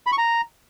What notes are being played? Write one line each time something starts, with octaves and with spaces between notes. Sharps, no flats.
B5
C#6
A#5